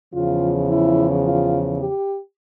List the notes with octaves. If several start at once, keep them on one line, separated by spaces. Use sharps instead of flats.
E2 C#3 F3 F4
E4
F4
G4